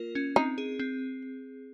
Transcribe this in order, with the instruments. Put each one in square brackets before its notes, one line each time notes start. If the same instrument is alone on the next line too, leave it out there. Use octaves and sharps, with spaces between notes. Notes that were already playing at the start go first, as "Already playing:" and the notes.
Already playing: [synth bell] A#3 F4 A#4
C#4
[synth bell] C4 [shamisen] D#4
[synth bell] G#4
C4